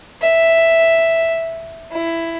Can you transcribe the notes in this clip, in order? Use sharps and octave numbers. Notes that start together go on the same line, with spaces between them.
E5
E4